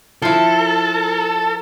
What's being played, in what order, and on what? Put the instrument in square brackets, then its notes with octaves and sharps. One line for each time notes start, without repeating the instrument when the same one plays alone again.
[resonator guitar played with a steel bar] F3 E4 [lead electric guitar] A4